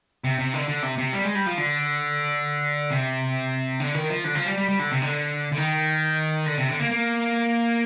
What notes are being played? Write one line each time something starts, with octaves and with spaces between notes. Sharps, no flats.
C3
C3
D3
D3
C3
C3
G3
G#3
G3
F3
D3
C3
D3
D#3
F3
D3
F3
G3
G3
G3
D3
C3
D3
D3
D#3
D3
C3
D3
A#3
A#3